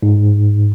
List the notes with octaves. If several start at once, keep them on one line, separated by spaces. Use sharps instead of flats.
G#2